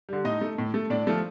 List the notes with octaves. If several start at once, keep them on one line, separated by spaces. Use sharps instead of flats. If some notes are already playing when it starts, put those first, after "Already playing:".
D3 G3
A2 D#4 D#5
A3
A2
A3
A2 D4 D5
F3 A3